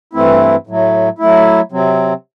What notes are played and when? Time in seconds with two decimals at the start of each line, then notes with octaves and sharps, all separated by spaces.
0.13 G2 E3 A3 C4 E4
0.67 A2 F#3 A3
1.19 F#3 A3 E4
1.72 C3 F#3 C4